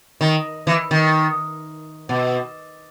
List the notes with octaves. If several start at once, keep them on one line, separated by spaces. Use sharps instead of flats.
D#3
E3
D#3
B2